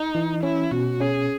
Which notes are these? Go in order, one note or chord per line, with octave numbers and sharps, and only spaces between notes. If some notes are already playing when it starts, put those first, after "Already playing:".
Already playing: D#4
E3
C#4 E4
B2 F#4
C#4 G#4